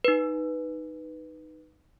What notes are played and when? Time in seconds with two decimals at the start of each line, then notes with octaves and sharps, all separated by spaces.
0.04 D#4 B4